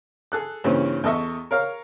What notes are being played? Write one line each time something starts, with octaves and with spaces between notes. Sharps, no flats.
G#4 A4 F#6
G2 A#2 C#3 E3 C4 C#4
E2 A4 D#5 E5 C#6
A#4 C#5 F5 A#5